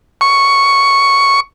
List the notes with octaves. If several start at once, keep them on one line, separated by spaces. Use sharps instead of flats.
C#6